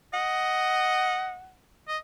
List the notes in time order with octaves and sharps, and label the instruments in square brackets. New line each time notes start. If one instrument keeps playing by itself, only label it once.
[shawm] D#5 [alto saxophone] F#5
[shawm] D#5